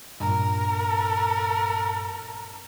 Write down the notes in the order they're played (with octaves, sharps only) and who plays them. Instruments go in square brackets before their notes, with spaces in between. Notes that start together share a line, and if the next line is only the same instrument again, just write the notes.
[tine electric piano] G2 A#2 [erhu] A#4